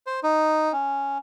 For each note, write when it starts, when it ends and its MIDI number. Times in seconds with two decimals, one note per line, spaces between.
0.07 0.20 72
0.23 0.72 63
0.73 1.18 61